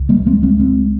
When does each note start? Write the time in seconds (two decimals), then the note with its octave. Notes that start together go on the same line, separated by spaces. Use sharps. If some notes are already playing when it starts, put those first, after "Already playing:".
Already playing: C#2
0.09 G3 A#3
0.26 G#3 C4
0.43 G#3 C4
0.59 G#3 C4